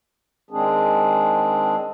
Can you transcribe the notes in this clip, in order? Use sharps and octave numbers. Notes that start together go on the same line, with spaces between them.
D#3 G#3 C4 D4 G#4